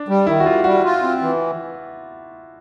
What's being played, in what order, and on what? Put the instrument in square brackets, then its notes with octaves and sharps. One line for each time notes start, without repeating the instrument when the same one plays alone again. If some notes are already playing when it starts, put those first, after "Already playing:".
Already playing: [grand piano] D4
[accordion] G3
[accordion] D#3 [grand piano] E4
[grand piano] F#4
[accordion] G3 [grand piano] F4
[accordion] G3 [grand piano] F#4
[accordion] F4
C4
E3